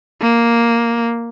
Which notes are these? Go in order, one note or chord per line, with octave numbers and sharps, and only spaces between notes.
A#3